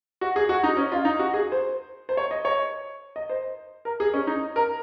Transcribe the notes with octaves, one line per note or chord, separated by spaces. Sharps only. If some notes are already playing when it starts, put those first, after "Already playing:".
F#4
G#4
F#4
D#4
C#4
F4
D#4
F#4
G#4
C5
C5
C#5
D#5
C#5
D#5
C5
A#4
G#4
C#4
D#4
A#4